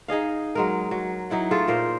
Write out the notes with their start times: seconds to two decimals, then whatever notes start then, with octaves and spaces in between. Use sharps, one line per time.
0.08 D#4 G#4 D#5 F5
0.55 F#3 G#3 A#4
0.91 F#3
1.30 F#3 D#4 E4 F#5
1.51 A3 F4 G#4 A4
1.68 A#2 A#4 C5